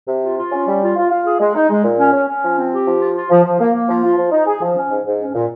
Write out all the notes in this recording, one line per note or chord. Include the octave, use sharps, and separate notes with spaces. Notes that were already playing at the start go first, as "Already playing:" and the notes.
C3
F4
F4
C#4
G3
F4
F4
F4
G#4
G#3
D#4
G#3
A#2
C#4
C#4
C#4
F3
C4
G4
F3
F4
F4
F3
F3
A#3
A#3
F3
F4
F3
D#4
G#4
F3
C#4
G#2
G#2
C#4
A#2